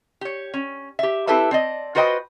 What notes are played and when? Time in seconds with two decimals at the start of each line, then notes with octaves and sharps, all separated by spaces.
0.21 G4 C#5
0.54 C#4
0.99 G4 E5
1.27 C4 E4 G4 A4 B4 E5
1.51 C4 D5 D#5
1.95 F4 F#4 B4 C5 D#5 G5